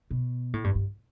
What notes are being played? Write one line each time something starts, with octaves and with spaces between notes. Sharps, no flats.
B2
A2
G2
G2